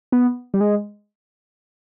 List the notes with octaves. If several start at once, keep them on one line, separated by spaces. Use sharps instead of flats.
B3
G3
G#3